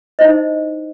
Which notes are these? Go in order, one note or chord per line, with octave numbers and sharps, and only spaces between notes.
D#4 E4 C5 D#5